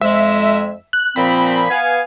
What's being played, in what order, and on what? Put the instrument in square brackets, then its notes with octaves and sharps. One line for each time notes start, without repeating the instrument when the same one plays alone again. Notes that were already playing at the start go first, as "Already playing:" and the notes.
[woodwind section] F2 G#3 [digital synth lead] E5
[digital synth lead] F#6
[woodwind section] A#2 F3 C4 [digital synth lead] B5
[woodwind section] B3 F5 G#5